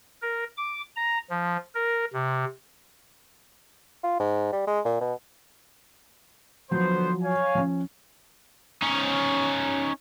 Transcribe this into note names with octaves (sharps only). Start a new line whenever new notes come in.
A#4
D6
A#5
F3
A#4
C3
F4
G#2
G3
G#3
A#2
B2
D3 F3 F#3 B3 C5
C#5 F5 G#5
F3 C#4
C#4 D#4